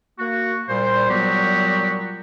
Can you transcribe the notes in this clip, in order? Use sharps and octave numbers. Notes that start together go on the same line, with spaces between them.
A#3 F#4
A#2 G3 C5
A#2 F#3 G3 B3 F#4 G4